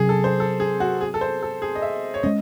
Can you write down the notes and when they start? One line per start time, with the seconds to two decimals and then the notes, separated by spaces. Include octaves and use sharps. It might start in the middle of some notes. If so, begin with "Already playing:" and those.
Already playing: C3 F#3 C#4 G#4
0.09 A4
0.24 C5
0.40 A4
0.60 G#4
0.80 F#4
1.01 G#4
1.14 A4
1.21 C5
1.42 A4
1.62 G#4
1.75 D#5
1.82 E5
2.14 C#5
2.23 G#3 C#4 D#5